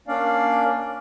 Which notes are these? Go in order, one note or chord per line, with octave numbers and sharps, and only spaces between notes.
A#3 C#4 D4 D5 F5